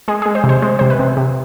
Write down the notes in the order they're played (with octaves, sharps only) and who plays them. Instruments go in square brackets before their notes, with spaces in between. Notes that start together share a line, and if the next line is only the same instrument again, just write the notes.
[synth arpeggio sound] G#3 G#4
G#3 G#4
C5
C3
C5
G#3 C5
C3 C5
B4
C3
C3